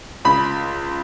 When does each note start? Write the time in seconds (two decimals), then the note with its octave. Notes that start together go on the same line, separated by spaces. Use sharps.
0.25 C#2 B5